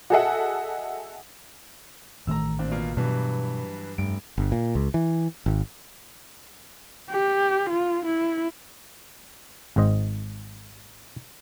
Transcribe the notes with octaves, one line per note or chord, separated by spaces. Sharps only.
F#4 G#4 A4 D#5 E5 F#5
A1 D#3 A3 A#5 E6
A#2 C4 D4
B2 A#3 F4
G2 B2 E3 F#3
F1 G2 D7
G1
A#2
C#2
E3
G#1
G4
F4
E4
G#1 G#2 C5 D#5